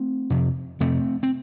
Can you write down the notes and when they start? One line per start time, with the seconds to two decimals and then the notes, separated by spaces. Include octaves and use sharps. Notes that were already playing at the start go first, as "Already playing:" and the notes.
Already playing: A3 C4
0.30 F2 C3
0.80 F2 C3 A3 C4
1.23 C4